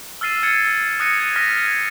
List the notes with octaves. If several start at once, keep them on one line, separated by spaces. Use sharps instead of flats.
E6 F6 A6 C7 D#7 E7
E6 G#6 A6 C#7 D#7
D#6 F#6 A#6 C#7 D#7
G#6 D#7
D#6 F6 A#6 B6 D#7
G#6